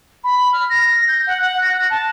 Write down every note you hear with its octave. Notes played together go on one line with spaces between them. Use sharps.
B5
F6
A#6
G6
F#5
F#5
A#6
F#6
A5